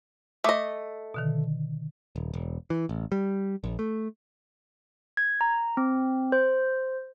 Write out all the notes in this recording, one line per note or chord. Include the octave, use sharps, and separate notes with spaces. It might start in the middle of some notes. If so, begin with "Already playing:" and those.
A3 D#5 D6 D#6
B2 D3 D#3
D#1
E1
E3
A1
G3
A#1
A3
G#6
A#5
C4
C5